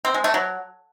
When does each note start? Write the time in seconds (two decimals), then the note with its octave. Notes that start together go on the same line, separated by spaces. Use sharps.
0.05 C4
0.14 G#3
0.24 A3
0.34 F#3